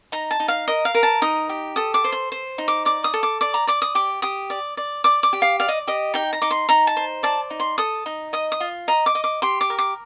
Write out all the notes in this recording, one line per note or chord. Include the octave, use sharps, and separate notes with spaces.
D#4 A#5
A5
D#4
F5
A#4 D#5
F5
A#4
A5
D#4 D#6
G4
A4 D#6
D6
C5
C6
C5
D#4
D6
D5 D6
D#6
A4
D6
D5 D6
A#5
D5 D6
D#6
G4 D6
G4 D#6
D5
D5
D5 D6
D6
G4
F5
D5 F5
D#5
G4 D#5
D#4 G5
A#5
D#4 D6
C6
D#4 A#5
A5
C5
D5 A5
D#4
C6
A4 D#6
D#4
D#5 D#6
D#6
F4
D#5 A#5
D6
D#5
D6
G4 C6
D6
A#4
D6